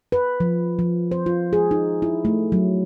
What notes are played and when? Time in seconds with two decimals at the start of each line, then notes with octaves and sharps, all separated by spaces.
0.12 B4
0.40 F3
0.79 F3
1.11 C5
1.26 F4
1.53 G#4
1.71 D#4
2.02 E4
2.25 A3
2.52 F#3